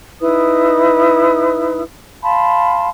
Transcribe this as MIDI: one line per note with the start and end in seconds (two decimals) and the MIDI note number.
0.21 1.82 63
0.21 1.82 64
0.21 1.82 71
0.21 1.82 87
2.23 2.89 77
2.23 2.89 81
2.23 2.89 83
2.23 2.89 84